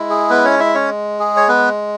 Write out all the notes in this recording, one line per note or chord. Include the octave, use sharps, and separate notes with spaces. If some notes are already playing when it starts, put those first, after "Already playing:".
Already playing: G#3 E4
G#4
B3 B4
C#4 C#5
E4 E5
C#4 C#5
G#4
C#5
B3 B4